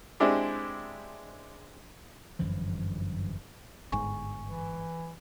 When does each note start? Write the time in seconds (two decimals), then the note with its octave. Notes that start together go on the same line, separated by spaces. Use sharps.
0.20 G#3 C4 D4 E4 G4
2.39 G1 F#2 E3 F3
3.92 G1 G#2 G#5 C#6
4.46 E3